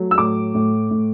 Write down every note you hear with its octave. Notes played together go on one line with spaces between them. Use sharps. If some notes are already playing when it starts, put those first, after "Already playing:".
Already playing: F#3 A3
E6
A2 D6
A2
A2